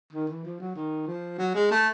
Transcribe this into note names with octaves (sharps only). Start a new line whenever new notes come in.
D#3
E3
F3
F#3
D#3
F3
F#3
G#3
A3